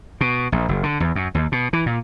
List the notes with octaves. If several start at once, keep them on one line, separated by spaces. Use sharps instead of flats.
B2
A#1
F#1
D3
E2
F#2
D#2
B2
E3
A#2